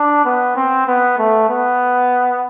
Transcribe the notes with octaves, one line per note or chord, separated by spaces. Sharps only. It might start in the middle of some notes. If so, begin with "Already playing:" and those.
Already playing: D4
B3
C4
B3
A3
B3